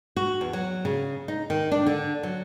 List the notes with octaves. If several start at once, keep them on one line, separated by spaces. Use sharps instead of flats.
F#4
E2
F#3
C#3
D#4
D#3
D4
D3
F#3